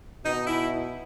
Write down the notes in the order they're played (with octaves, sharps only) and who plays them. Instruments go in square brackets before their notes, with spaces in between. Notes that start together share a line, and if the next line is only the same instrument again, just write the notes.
[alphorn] B2 [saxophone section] D#4
[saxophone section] E4